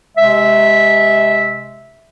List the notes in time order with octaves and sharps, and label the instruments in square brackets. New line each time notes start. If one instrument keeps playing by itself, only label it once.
[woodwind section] C3 G#3 E5